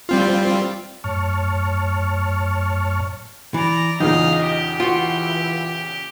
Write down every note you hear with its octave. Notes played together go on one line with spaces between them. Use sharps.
G3 C4 F4
F#2 A2 C#5 A5 C#6 F6
E3 D5 A#5
E2 A#2 C#3 D#4 D#5 F5
G4
E3 F4 F#4